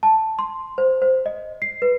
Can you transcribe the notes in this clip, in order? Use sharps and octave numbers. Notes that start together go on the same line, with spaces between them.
A5
C6
C5
C5
D#5
C7
B4